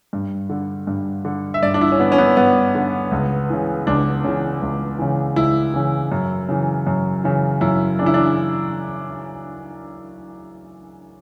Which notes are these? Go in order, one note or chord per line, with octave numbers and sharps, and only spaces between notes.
G2
D3
G2
D3
E5
G2 D5
D4
E4
C#4
D3 B3
C#4
B3
G2 B3
D3
C#2
C#3 E3
C#2 D4
C#3 E3
C#2
C#3 E3
C#2 E4
C#3 E3
F#2
C#3 E3
F#2
C#3 E3
F#2 E4
C#3 E3 D4 E4
D4